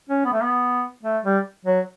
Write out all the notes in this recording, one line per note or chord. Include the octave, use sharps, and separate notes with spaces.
C#4
B3
A3
B3
A3
G3
F#3